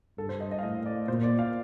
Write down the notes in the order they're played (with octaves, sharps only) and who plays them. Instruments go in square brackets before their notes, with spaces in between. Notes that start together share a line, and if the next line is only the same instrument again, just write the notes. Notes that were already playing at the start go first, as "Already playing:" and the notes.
[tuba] G2 [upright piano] A4
[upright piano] C5
D#5
D#5
F5
[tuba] A2 [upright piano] D#5
[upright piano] D5
[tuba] A#2 [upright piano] C5
[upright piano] D5
F5